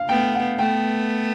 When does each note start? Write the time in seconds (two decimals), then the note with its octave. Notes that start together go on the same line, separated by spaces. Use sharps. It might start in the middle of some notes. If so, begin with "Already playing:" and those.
Already playing: F5
0.09 A3 B3 G5
0.35 F#5
0.59 A3 B3 G5